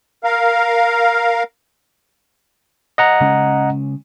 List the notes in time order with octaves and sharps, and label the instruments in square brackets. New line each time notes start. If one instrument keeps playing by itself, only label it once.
[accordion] A#4 F5
[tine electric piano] D#5 F#5 A#5
[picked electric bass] C#3 G#3 C#4